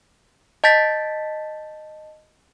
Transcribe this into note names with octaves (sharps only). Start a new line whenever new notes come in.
D#5 A5 G6 A6 B6